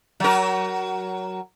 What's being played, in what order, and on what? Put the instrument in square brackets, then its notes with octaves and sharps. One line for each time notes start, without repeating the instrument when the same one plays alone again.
[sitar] F#3 A#4